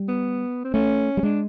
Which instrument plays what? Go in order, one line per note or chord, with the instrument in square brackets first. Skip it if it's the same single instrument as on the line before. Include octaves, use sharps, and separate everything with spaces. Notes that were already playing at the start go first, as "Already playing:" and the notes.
Already playing: [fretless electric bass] G3
[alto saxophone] B3
C4
[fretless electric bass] A3 [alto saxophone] C#4
[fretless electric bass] G3
[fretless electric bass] G#3 [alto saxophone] D4